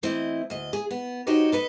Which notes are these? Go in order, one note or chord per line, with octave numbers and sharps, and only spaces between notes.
E3 A3 C4 E4 D#5
D2 D#5
G#4
B3
D#4 F#4 G4 C5 C#5 D#5
A4 B4 D#5